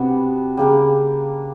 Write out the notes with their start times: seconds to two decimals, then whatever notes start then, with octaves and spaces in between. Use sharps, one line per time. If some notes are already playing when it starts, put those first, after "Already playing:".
Already playing: C3 G3 B3 D4 F#4
0.57 C#3 G3 A#3 D4